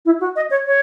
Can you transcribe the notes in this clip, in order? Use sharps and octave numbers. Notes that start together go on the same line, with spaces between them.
E4
F#4
D#5
C#5
C#5